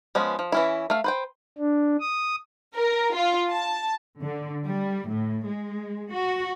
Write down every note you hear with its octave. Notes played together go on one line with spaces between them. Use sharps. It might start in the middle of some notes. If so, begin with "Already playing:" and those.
F3 G#3 B3 C#4
F3
E3 C#4 E4
A3 F5
B4 C5 G5
D4
D#6
A#4
F4
A5
D3
G3
A2
G#3
F#4